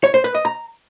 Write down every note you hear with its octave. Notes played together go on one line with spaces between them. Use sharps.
C#5
C5
B4
D#5
A#5